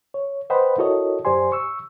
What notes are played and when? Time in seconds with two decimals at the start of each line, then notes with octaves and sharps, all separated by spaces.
0.14 C#5
0.50 B4 C5 D#5 F#5 G5 B5
0.78 E4 F#4 A4 A#4 C#5 D#5
1.25 F#2 G4 C5 D5 G#5 C6
1.52 C#6 E6